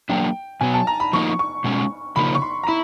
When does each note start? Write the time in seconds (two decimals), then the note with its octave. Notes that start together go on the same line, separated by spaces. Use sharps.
0.09 F#3 A#3 D4 G5
0.61 B2 F#3 B3 G#5
0.74 A5
0.87 A#5
1.00 B5
1.13 F3 A#3 D#4 C#6
1.39 C#6
1.64 B2 G#3 C#4
2.16 C#3 F3 A#3 D#4 B5
2.35 C#6
2.42 C6
2.63 A#5
2.67 E4 B5